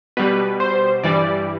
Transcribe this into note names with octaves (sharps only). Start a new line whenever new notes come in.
B2 G3 B4
C5
G2 E3 G3 D5